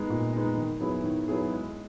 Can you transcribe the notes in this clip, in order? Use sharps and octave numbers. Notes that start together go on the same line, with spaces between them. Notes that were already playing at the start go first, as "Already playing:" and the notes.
Already playing: G#3 B3 D#4
A#2
G#3 B3 D#4
D#3
F#3 B3 E4 G#4
D#3
F#3 B3 E4 G#4
G#3